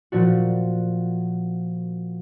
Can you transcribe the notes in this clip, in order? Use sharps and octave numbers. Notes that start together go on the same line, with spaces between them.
A#2 F3 D4 F#4